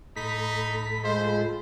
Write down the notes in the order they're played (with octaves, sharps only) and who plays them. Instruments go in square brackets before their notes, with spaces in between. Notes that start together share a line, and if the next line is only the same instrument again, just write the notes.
[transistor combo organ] A2 A4 B5 [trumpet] D#4 [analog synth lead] B6
[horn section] G#3 [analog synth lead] F4 [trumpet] C5